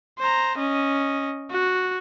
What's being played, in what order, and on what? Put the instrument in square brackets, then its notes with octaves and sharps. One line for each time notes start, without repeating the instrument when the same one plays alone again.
[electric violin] C5 A#5
C#4 D#5
F#4